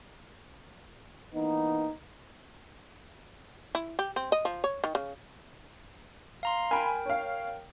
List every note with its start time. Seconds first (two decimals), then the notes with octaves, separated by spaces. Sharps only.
1.34 E3 A#3 B3 D#4
3.75 E4
3.99 G4
4.16 C4
4.32 D#5
4.45 F3
4.64 C#5
4.84 D#3
4.95 C#3
6.43 F5 A#5 C6
6.71 A#4 G5 G#5 B5
7.06 C#5 F5